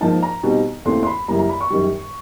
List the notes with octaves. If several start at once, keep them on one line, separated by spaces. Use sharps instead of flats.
G#2 F3 A#3 D#4 A5
A#5
B2 G3 C4 D#4
D#2 C#3 E3 A3 C4 C6
C6
B5
F#2 C#3 E3 G3 A#3 A#5
A#5
B5
C#6
F#2 D#3 G3